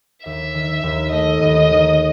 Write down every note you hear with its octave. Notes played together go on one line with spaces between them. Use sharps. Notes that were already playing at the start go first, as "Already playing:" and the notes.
D#2 E5
D#3
D#2
A3 D#5
D#2
D#3